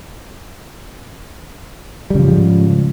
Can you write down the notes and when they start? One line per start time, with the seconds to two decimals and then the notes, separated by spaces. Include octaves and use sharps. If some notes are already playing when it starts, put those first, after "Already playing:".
2.10 G3
2.15 C#3
2.20 F3
2.24 G#2